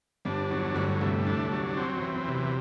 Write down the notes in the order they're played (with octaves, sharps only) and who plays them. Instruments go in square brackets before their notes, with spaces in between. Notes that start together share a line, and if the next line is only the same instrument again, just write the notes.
[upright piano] G1 G2 [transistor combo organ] D4
[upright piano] E2 E3 [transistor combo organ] F#3
[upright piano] D2 D3 [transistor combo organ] G2
[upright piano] C2 C3 [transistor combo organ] A3
[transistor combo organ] D4
F#3
C4
[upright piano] F#2
[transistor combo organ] E3
[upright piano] E2
[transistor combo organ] C3
[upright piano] F#2